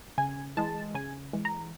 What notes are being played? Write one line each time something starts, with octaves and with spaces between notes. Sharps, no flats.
C#3 G#5
E3 G#3 A5
C#3 G#5
E3 G#3
A#5